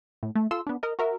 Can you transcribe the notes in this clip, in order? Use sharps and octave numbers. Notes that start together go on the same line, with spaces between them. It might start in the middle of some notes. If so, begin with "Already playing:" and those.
A2
A3
F4 A4 C6 E6
B3 D4
A#4 D#5
F#4 A#4 E5